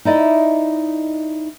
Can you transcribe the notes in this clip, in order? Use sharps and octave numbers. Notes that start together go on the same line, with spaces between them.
D#4 E4 D5 D#5